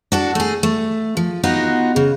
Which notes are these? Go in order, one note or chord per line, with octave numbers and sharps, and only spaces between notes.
D4 F#4 A4
A3 G#4
A3
F3
B3 D#4 F4 F#4 D#5
C#3